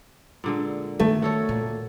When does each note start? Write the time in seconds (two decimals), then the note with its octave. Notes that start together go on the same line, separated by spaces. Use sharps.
0.44 A#2 D3 G#3
1.00 D#3 A3
1.22 F#4 A4 C#5
1.49 A#2